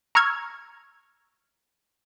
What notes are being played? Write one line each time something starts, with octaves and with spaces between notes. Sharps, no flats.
A#5 C#6 E6 F6 G#6